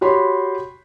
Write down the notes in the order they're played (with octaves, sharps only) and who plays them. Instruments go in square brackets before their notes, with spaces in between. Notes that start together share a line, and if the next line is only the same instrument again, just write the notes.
[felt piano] F#4 G4 C#5 B5 C6